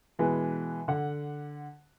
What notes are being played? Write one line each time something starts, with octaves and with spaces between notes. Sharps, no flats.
B2 E3 G#3 B4
D3 F#5